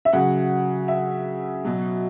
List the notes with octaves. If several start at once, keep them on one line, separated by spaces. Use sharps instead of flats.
E5
C#3 F#3 F#5
E5
B2 F#3